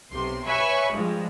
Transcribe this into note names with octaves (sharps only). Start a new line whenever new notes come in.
B1 C3 C6
B4 C#5 E5 G#5 B5 C#6
G2 F3 G#3